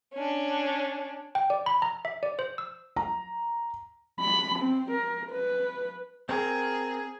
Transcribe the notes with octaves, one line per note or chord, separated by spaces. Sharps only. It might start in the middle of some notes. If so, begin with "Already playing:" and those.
C#4 D4
G5
D5
B5
A#5
E5
D5
C5
E6
A#5
B5
C4
A#4
B4
C4 G#4 A#4